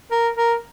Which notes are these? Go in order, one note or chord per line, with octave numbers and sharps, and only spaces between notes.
A#4
A#4